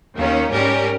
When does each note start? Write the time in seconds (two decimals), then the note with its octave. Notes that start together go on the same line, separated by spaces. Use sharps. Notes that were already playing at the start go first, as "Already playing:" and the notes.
0.15 D#2 D#3 A#3 C#4
0.50 G#2 G3 C#4 G4 A#4